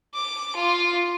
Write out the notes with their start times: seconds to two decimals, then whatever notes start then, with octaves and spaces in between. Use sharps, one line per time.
0.14 D6
0.56 F4